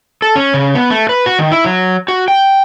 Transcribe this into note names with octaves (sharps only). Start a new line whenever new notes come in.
A4
C#4
C#3
B3
A3
B4
F#4
D#3
E4
F#3
F#4
G5